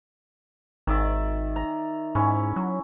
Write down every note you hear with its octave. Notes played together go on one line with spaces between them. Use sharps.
G#1 D#3 D5 E5
A#5
G#2 C#4 E4
F#3